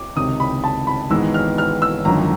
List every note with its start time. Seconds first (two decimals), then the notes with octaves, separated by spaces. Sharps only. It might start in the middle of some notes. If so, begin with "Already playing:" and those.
Already playing: D6
0.16 C#2 C3 D#3 D#6
0.40 B5
0.64 A5
0.87 B5
1.10 G#1 G#2 E3 G#3 B3 E6
1.34 F6
1.58 F6
1.82 E6
2.05 G#1 F#2 D3 F3 A#5